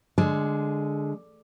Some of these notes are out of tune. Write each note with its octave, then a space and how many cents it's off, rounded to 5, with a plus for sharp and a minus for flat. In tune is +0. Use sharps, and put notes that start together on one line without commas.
D3 +0 G#3 +0 G#5 +45